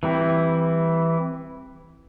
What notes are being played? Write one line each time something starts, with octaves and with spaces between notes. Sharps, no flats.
E3 G3 C4 E4